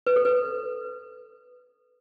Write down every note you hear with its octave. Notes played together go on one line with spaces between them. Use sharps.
B4
A4
B4